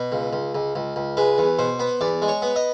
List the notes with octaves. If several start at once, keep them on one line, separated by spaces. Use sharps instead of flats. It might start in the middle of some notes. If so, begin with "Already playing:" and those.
Already playing: B2
C#2
C#2
C#2
C#2
C#2
G#3 B4
E2
B2 C5
B3
E2 D5
G#3
C#5
B3
D#5